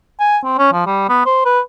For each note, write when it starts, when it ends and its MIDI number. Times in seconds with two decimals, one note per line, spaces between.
0.20 0.38 80
0.44 0.57 60
0.58 0.72 61
0.73 0.86 53
0.86 1.04 55
1.09 1.24 59
1.26 1.45 72
1.45 1.60 71